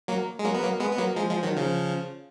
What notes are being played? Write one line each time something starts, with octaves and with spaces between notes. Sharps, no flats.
F#3 A#3
G#3
F#3 A#3
B3
F#3 A#3
G#3 B3
B3
F#3 A#3
F3 G#3
F3 G#3
D#3 F#3
C#3 F3